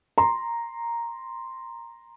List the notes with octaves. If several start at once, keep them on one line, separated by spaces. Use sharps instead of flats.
A#5 C6